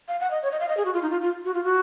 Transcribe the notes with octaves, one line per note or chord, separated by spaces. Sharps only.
F5
F#5
D#5
C#5
D#5
F5
D#5
G#4
F#4
F4
D#4
F4
F4
F#4
F4
F#4